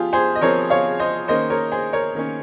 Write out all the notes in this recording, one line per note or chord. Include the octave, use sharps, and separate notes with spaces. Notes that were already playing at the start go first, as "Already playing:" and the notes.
Already playing: F3 F4 G4 G#4
G#4 C5
D#5
F3 C4 A#4 C#5
C#5 F5
C5 D#5
D#3 A#3 C#4 C5 D#5
A#4 C#5
G#4 C5
A#4 C#5
D#3 A#3 C#4